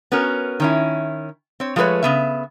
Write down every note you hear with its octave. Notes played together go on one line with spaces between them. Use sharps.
B3 C#4 F#4 A#4
D#3 C#4 E4
C4 C#5
F3 G#3 A3 A4 B4 C#5
C#3 B3 E5